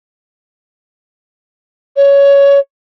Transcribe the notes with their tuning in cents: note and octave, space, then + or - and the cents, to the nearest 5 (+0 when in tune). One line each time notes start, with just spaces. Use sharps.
C#5 +15